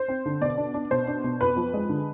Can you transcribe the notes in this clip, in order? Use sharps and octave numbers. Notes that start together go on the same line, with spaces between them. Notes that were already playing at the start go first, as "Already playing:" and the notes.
Already playing: C5
C4
D3
B2 D5
D4
D4
B2 C5
D4
B2
F2 B4
F3
G#3
D3